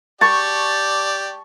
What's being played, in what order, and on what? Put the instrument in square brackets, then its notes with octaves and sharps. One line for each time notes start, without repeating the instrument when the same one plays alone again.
[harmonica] G4 D5 [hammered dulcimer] A5 C#6